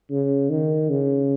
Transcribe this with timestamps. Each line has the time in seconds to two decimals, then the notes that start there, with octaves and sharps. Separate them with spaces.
0.11 C#3
0.50 D#3
0.90 C#3